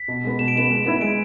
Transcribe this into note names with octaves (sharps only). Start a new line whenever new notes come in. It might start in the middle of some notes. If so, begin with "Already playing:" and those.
Already playing: B6
B2
G#3 B3
B2 E7
D7
G#3 B3 E7
G#3
B3 E4
G#3 D7